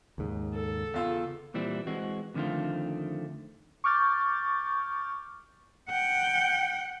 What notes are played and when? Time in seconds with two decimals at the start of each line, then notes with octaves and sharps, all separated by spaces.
0.18 D#2 G#2 C#3
0.53 A4
0.94 E2 F4 E6
1.54 A#2 E3 G3 C4 E4
1.87 E3 G#3 C4 F#4
2.34 F2 D3 D#3 A3 C4 F4
3.84 C#6 D6 F6 G6 A6
5.90 F#5 G5